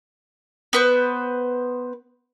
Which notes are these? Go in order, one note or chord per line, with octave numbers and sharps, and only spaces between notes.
B3 B4 C5